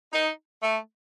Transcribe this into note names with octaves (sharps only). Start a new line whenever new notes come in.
D#4
A3